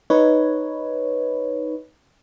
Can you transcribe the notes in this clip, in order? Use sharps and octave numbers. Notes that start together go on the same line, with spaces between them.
D#4 B4 C#5